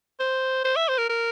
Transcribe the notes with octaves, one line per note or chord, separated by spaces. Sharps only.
C5
C5
E5
C5
A#4
A#4